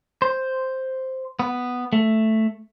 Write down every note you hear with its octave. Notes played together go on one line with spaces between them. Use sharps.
C5
B3
A3